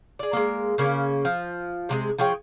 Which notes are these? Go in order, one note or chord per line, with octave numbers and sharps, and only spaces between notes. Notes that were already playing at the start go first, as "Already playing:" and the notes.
G#4 D5
G#3 A#3
C#3 A#3 C#4
F3
C3 F3 G#3
F3 G#4 C#5 G5